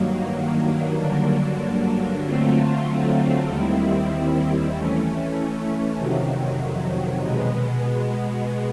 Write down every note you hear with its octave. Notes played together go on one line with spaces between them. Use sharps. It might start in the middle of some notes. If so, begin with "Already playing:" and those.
Already playing: G2 D#3 F#3 A#3
G2 D3 F#3 A#3 D4
D3 F#3 A3 C4 F4
D#2 D#3 G3 C4 E4
E3 A3 C#4
F2 C3 D#3 F#3
B2 G#3 B3